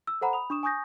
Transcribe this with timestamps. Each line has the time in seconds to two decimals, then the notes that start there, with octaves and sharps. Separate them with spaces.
0.07 E6
0.21 A4 C5 F#5 A#5 B5
0.33 B5 D#6 F7
0.50 D4 C#6 D#6 E7
0.63 G#5 C#6 D#6 G6 A#6